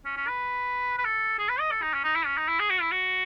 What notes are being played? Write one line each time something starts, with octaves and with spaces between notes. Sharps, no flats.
C#4
C#4
B4
B4
A4
G#4
B4
D#5
A4
D#4
C#4
D#4
E4
C#4
D#4
E4
G#4
F#4
E4
F#4